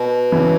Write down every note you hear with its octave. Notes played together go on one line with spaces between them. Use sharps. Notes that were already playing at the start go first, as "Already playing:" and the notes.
Already playing: B2
C#3 E3